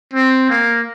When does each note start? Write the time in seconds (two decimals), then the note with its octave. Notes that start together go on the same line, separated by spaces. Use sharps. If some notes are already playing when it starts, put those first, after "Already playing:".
0.14 C4
0.50 A#3